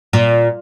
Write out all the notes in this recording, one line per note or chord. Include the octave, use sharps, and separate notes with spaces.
A#2